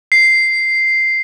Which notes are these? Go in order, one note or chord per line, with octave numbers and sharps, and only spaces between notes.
C7